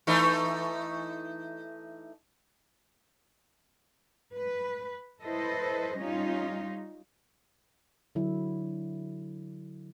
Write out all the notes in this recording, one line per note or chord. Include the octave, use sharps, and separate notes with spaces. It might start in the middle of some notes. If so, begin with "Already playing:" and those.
E3 A3 D#4
B4
E4 A4 B4 C5 D#5
G3 C#4 D#4 F4
D3 F#3 E4